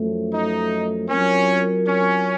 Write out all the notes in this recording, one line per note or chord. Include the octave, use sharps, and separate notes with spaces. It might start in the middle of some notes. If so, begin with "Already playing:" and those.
Already playing: F#2 F3 A3
D#4
F#3 C4 C#4 F4 A#4
C#4